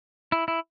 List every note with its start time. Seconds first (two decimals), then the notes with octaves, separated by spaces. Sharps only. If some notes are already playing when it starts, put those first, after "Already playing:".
0.32 E4
0.48 E4